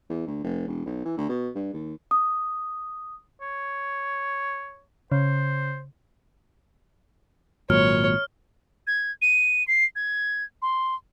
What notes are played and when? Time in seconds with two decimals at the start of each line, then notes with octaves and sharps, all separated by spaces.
0.10 E2
0.27 D2
0.44 F1
0.67 E1
0.86 B1
1.05 E3
1.18 D2
1.29 B2
1.55 G2
1.74 D#2
2.11 D#6
3.41 C#5
5.12 C#3 C5
7.70 G#1 A#2 F#3 C#5 F6
8.87 G#6
9.22 D#7
9.68 C7
9.96 G#6
10.62 C6